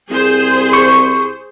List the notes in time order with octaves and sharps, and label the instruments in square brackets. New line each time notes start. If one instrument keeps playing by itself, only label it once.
[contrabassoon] C2 [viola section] G#4 C5
[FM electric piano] C#6